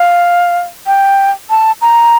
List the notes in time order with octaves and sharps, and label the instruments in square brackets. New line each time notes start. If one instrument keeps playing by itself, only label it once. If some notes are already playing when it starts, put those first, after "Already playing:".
Already playing: [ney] F5
G5
A5
A#5